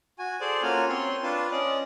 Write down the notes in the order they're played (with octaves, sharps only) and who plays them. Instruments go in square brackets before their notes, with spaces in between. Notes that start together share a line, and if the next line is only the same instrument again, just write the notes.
[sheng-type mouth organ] F#4 G#5
G#4 A4 C5 D5 A5
A#3 C#4 F4 F#4 G#5 F6
C4 C#5 C6
D4 F4 B4 A5
C#4 D5 D#5